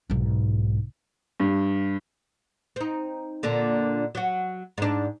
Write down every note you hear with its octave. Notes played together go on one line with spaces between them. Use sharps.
B1 G#2
G2
C4 D#4
A#2 D3 D4
F#3 F#4
G#2 D4